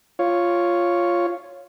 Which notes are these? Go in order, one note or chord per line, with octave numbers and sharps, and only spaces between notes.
F4 C#5